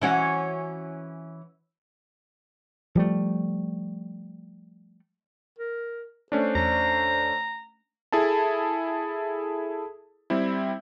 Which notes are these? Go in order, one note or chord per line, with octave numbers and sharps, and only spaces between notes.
E3 C#4 F#4
F3 G3 A3
A#4
A3 C#4 D4 C5
E2 A#5
E4 G#4 A4 A5
G3 C4 E4